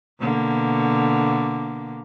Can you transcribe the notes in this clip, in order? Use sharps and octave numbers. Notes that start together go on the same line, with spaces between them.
B2 D3 A#3